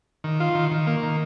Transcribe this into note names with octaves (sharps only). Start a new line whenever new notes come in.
D#3
F4
D#3
D#3
A#3
D#3